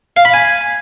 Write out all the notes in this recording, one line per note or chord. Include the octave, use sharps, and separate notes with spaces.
F5
B5
G#5